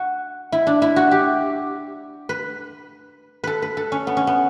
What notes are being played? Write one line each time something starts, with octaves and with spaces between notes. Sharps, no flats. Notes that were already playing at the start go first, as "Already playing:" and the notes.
Already playing: F#4
E4
D4
E4
F#4
G4
B4
A4 B4
B4
A4
C#4
B3
C#4
B3